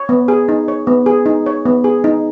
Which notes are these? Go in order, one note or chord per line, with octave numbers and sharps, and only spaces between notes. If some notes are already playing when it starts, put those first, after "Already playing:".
Already playing: C#5
B3
G#4
D#4
C#5
B3
G#4
D#4
C#5
B3
G#4
D#4